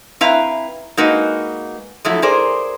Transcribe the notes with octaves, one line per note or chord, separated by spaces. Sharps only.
C4 E4 B4 E5 F5 A#5
G#3 A#3 D#4 F#4 B4
F3 F#3 A3 E4
G#4 A#4 C5 D5